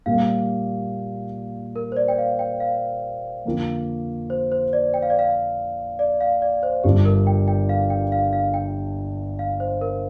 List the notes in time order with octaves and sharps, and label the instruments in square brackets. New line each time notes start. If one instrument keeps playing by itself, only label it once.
[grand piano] A#2 G3 A#3 G4 [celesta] F5
[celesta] A#4
C5
D5
G5
F5
G5
F5
[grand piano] F2 D3 A#3 F4
[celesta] C5
C5
D5
G5
F5
D5
F5
D5
F5
D5
C5
[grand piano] G1 G2 G3 D4 F4 [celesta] G4
[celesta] A#4
G5
G5
F5
G5
F5
F5
G5
F5
C5
A#4